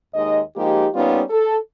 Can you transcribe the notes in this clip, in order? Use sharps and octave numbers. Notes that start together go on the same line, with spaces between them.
D#2 G#3 D#4 D#5
F3 G#3 A#3 D#4 G4
G3 A#3 B3 C#4 D#4 F4
A4